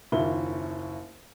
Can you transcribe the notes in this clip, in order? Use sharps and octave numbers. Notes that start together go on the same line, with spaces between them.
F#1 D#2 A#3 F4 E5 G7